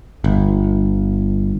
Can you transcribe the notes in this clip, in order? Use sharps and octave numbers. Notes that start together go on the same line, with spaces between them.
G1